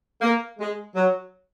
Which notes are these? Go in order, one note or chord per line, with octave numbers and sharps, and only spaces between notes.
A#3
G#3
F#3